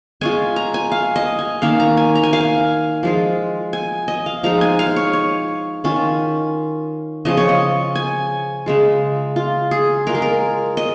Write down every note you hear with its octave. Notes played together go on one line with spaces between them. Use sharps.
G#3 C#4 F4 G#5
A#5
G#5
F5
D#5
G#5
D#3 A#3 C#4 F5
A#5
G#5
A#5
G#5
F5
G#5
F3 G#3 F4
G#5
D#5
F5
F3 G#3 D#4 A#5
G#5
F5
C#5
C#5
D#3 C#4 F4
C#3 F3 C#4 F4 D#5
C#5
D#5
G#5
C#3 G#3 F4
F4
G#4
G#3 F4 A#4
G#4
A#4
D#5